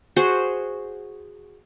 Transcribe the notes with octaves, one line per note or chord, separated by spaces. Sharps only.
F#4 G#4 C5